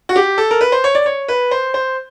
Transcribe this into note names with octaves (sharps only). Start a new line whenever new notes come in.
F#4
G4
A4
A#4
B4
C5
C#5
D5
C#5
B4
C5
C5